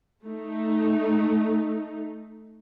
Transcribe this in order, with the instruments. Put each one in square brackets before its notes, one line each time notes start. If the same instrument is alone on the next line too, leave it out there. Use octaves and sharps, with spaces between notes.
[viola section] A3 D#4